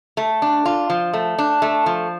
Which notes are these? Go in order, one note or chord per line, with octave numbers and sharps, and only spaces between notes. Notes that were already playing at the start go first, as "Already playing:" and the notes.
A3
D4
F4
F3
A3
D4
A3
F3